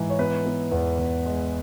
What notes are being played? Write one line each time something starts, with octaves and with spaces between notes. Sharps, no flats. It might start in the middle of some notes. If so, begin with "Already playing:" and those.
Already playing: G#2 E3
C#5
B3 B4
B3
E2
E2
G#3